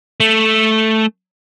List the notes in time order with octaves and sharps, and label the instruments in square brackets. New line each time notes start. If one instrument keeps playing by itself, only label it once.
[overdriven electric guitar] A3